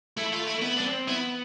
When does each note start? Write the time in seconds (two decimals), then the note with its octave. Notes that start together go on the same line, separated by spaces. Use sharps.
0.17 A3 E4
0.33 F4
0.47 E4
0.62 B3 E4
0.77 D4
0.80 B3
0.86 C4
1.08 B3 E4